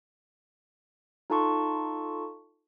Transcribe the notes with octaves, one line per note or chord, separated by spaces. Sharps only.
D#4 F4 A4 A5 C6 C#6